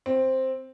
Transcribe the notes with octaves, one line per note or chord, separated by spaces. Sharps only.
C4